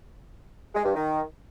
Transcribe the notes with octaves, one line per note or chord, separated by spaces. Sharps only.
G#3
G2
D#3